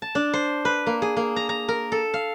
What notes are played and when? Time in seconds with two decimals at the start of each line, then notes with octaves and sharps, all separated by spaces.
0.02 A5
0.15 D4
0.33 C5
0.65 B4
0.86 A#3
1.02 G#4
1.17 A#3
1.36 A#5
1.49 A#5
1.68 A#4
1.92 A4
2.14 F5